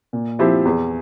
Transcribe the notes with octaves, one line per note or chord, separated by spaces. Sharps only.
A#2
F3 C4 E4 G4
E2